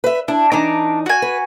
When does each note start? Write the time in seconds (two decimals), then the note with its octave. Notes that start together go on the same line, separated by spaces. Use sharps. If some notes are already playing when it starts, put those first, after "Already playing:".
0.04 B4 E5
0.28 D4 E4
0.52 E3 D4 D#4 A#5 D6
1.06 F#4 G#5
1.22 B4